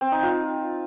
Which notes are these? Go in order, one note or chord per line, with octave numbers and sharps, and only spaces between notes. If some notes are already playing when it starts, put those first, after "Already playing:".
C4
D#4
F4